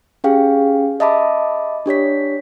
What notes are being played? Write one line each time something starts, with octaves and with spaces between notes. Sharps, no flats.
C#4 G4 G#4 F5 G5
D#5 E5 A5 B5 D6
D4 G4 C#5 B6